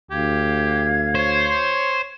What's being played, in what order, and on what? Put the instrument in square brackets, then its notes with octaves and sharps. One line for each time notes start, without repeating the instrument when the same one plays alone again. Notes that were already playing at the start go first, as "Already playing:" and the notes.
[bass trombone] D2 [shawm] G4 [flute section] F5 G#6
[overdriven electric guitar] C5 [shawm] C#5